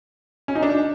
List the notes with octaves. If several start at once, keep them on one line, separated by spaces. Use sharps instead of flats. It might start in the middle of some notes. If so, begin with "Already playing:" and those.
C#4
D#4
D4